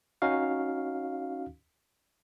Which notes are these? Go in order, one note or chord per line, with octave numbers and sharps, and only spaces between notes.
C#4 D#4 F#4 F5